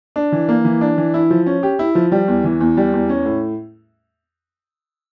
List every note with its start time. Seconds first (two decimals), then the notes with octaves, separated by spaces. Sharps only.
0.16 D4
0.32 E3
0.49 A#3
0.65 E3
0.81 D4
0.98 E3
1.14 E4
1.30 F3
1.46 C#4
1.63 G4
1.79 E4
1.95 F3
2.12 G3
2.28 E2
2.44 E3
2.60 E2
2.77 G3
2.93 E2
3.09 C#4
3.26 A2